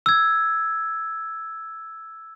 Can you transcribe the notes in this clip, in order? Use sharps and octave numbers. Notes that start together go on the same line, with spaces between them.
E6 G#6